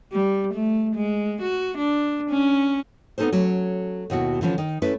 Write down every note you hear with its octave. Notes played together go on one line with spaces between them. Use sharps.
G3
A3
G#3
F#4
D4
C#4
B3 C4 D#4 A4 A#4 C5
F#3 A3 C#4
D#2 B2 E4 F#4
D3 E3 F3 C#4 F4
D#3
A3 C#4 E4 B4